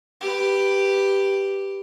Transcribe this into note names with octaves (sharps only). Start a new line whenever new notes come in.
G4 B4